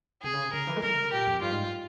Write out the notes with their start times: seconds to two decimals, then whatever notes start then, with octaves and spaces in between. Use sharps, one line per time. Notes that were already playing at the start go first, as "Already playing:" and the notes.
0.23 C3 G#4
0.33 C#3
0.43 C3
0.53 C#3 A#4
0.67 E3
0.76 G#3
0.82 G3 A#4
0.92 C#3
1.02 C3
1.12 A#2 G4
1.27 F2
1.41 G2 F4
1.51 G#2